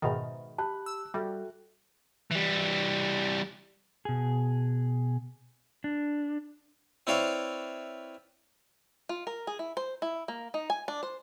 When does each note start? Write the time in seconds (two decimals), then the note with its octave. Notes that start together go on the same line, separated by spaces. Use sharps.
0.02 G#2 B2 D#3 D#5 E5 B5
0.58 G4 A5 B5 F#6
0.86 E6
1.14 G3 F#4 A4 E5 G5
2.31 E3 G3
4.05 B2 G#4
5.84 D4
7.07 C4 E4 B4 C#5 D5 F5
9.09 F4
9.27 A#4
9.47 G#4
9.59 E4
9.77 C5
10.02 E4
10.28 A#3
10.54 D#4
10.70 G#5
10.88 D4
11.03 C5